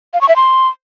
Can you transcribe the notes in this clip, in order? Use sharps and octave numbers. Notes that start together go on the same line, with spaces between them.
F5
C#6
E5
C6